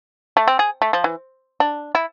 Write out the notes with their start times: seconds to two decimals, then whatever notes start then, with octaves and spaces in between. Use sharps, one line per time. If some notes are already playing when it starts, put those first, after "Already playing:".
0.37 A3
0.48 C4
0.59 G#4
0.82 A3
0.93 F3
1.04 E3
1.60 D4
1.95 E4